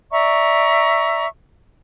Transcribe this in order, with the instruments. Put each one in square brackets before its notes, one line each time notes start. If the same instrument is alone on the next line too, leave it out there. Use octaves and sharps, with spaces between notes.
[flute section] D5 E5 A#5 C#6